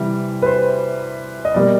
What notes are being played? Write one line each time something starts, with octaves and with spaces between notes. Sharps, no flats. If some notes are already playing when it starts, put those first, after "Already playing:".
Already playing: C3 E3 G3
B4
C5
D#5
B2 G3 A#3 D5